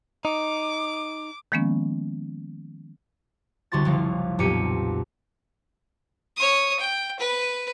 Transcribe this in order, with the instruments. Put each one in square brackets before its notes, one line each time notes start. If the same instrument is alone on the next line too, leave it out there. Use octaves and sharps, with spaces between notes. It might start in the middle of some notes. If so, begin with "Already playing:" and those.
[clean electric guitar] D#4 [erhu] D6
[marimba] D#3 F3 G#3 A#3 B3 C#4
[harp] C2 D3 F#4 C6 A6
F#1 C2 F3 F5 A#6
B1 F2 A#2 G4 C#7 D#7
[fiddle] C#5 D#6
G5
B4